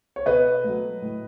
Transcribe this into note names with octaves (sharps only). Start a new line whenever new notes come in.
C#5
B2 B4 D#5
F#3 A3
A2